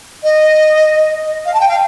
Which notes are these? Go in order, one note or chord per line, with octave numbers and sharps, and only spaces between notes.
D#5
F5
A5
G5
F5